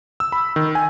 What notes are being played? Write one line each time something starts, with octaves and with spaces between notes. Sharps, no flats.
E6
B5
D#3
G#5